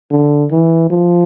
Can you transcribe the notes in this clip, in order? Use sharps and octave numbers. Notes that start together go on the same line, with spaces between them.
D3
E3
F3